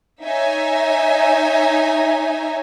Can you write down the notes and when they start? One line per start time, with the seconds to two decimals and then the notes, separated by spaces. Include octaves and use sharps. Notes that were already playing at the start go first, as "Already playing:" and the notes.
0.24 D#4 C#5 E5 G#5